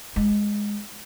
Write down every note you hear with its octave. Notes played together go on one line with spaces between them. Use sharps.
G#3